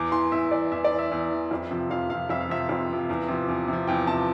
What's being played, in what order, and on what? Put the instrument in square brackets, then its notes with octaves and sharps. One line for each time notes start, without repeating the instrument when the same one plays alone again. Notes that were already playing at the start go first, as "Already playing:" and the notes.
Already playing: [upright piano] E2 D6
E3 C6
E2 E5
E3 D5
E2 E5
D5
E3
E5
E2
E3
F2
C3 F3
F2 F5
C3 F3 F5
F2 E5
F5
C3 F3 E5
F2
C3 F3
E2
C3 F3
E2
C3 F3
E2 G5
C3 A5
F3